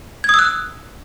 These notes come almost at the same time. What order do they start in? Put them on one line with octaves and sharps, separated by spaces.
G#6 D#6 E6 F#6